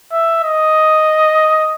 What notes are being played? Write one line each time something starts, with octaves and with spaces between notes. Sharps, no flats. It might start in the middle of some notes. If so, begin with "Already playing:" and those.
E5
D#5